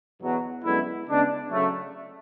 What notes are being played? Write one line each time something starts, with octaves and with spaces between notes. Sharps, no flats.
E2 B2 F#3
F#2 D3 G#3 B3 E4
C#3 G#3 B3 D4
C#3 F#3 A3